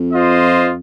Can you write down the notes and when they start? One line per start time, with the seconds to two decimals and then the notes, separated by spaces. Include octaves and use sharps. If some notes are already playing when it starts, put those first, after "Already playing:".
Already playing: F2
0.11 F4 C5 D#5